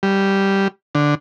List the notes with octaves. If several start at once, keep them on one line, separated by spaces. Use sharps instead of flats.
G3
D3